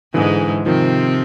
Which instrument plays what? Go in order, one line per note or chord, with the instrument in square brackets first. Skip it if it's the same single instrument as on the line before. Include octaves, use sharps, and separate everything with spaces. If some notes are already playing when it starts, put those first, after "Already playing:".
[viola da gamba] G#2 G#3 [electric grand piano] D3 E3
[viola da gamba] C3 C4 [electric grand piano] D#3 F3